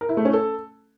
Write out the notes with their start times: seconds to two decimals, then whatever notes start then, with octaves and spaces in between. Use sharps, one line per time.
0.01 A#4
0.09 E4
0.17 A3
0.25 C#4
0.33 A4